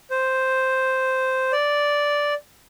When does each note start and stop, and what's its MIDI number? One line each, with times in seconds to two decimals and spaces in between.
0.10 1.52 72
1.52 2.34 74